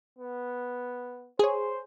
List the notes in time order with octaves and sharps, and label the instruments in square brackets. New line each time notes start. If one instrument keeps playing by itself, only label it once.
[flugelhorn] B3
[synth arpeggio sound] G#4 C#5 [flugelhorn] C5